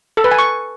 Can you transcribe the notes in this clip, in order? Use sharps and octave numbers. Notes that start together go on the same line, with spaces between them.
A4
B4
G#5
C#6